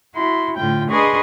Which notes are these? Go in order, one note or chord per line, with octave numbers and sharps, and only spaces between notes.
E4 F#4 C6
A2 D3 F4 G5
D4 G#4 B4 D#5 C6 C#6